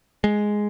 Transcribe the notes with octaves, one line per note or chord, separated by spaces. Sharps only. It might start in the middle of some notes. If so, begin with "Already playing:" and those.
G#3